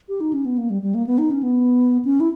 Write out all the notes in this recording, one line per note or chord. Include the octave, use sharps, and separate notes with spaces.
G4
D#4
C#4
B3
A#3
G3
G3
A#3
B3
D#4
C#4
B3
C#4
E4